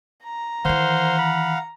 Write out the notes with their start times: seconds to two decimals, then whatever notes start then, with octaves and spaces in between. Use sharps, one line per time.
0.24 A#5
0.65 D#3 E3 C5 F5 F#5
1.19 B5